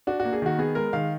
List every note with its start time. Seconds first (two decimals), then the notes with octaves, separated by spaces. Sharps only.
0.07 D4 F#4
0.20 A#3 F#4
0.33 G#4
0.42 D#3 F#4
0.58 B3 G#4
0.75 G#3 A#4
0.93 D#3 F5